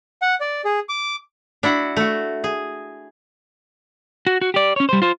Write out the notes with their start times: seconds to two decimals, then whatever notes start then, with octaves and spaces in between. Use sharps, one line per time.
0.22 F#5
0.40 D5
0.65 G#4
0.89 D6
1.63 D4 E4 F#4 F#5
1.96 A3 F#4
2.44 G#4
4.27 F#4
4.41 F#4
4.54 G4 D5
4.76 C#4 C#5
4.89 G3 C5
5.02 F4 C5